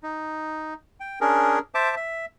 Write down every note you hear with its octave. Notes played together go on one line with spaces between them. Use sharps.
D#4
G5
C#4 D4 G#4 A#4
C5 E5 A5 D6
E5